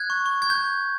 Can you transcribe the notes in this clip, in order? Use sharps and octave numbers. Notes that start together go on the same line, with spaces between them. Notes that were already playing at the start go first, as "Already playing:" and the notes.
Already playing: F#6 G#6
C#6
C#6
C#6 G#6
G6